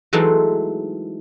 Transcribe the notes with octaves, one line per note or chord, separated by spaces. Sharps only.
E3 F#3 G#3 A3 C4 D#4